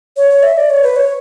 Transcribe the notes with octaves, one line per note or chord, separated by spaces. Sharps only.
C#5
C#5
E5
D5
C#5
B4
C#5